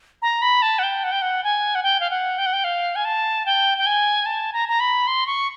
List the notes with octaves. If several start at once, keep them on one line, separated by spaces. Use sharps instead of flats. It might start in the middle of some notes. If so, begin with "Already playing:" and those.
A#5
B5
A5
F#5
G5
F#5
G5
F#5
G#5
F#5
G5
F5
F#5
G5
F#5
G5
F5
G#5
A5
G5
G5
G#5
A5
A#5
A#5
B5
C6
C#6